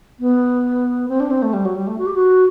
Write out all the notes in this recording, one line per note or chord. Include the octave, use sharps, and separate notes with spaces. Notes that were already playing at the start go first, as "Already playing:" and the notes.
B3
C4
D4
C4
A3
G3
F#3
G3
A3
F#4
G4
F#4